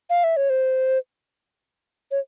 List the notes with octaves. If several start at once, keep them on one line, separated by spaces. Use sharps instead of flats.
F5
E5
C#5
C5
C#5